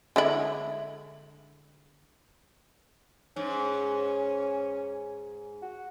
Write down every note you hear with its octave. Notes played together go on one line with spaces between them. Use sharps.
D3 G#3 E4
G#2 C#4
F#4